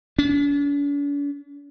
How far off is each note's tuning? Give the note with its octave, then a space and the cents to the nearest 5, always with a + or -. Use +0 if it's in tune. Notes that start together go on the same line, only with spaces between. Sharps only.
D4 -45